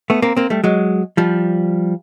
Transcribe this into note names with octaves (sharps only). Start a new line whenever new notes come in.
A3 B3
A#3 C4
A#3 C4
G3 A3
F#3 G#3
F3 G3